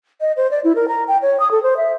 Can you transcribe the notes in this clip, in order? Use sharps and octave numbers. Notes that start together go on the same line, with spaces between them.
D#5
C5
D5
E4
A#4
A#5
G5
C#5
D#6
A4
C5
E5